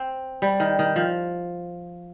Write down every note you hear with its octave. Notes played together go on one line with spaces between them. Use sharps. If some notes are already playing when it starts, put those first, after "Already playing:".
Already playing: C4
G3
D#3
D#3
F3